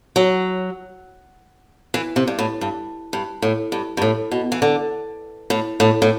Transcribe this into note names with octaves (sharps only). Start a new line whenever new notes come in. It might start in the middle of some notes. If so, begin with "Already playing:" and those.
F#3
E3
C3
G2
A2
G2
G2
A2
G2
G2
A2
B2
E3
D3
A2
A2
A2